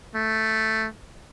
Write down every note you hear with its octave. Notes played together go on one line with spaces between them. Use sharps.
A3